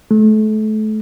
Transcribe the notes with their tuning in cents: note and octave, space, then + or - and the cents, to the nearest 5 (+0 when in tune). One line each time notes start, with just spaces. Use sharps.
A3 -30